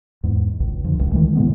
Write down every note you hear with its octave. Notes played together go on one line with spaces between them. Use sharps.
E2 G#2
G#1 C#2
F2 D3
D#1 C#2
D#3 E3 G#3 A3
A2 C#3 G#3 B3